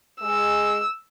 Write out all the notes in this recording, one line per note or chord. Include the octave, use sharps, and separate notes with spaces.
G#3 G#4 E6